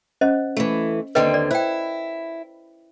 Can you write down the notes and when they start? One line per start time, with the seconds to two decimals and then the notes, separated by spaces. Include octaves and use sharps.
0.21 C#4 C5 D#5
0.57 E3 A3
1.15 D#2 D3 C4 B4 D#5 G5
1.34 D5
1.51 E4 C5 G5